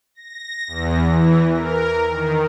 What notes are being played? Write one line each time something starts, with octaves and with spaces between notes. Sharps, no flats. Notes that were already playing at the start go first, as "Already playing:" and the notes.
A#6
E2
E3
A#4
D#3